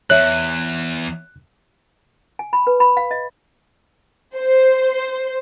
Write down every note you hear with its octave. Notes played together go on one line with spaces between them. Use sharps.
E2 C#5 E5 F#6
G#5
B5
B4
B5
F5
D#5
C5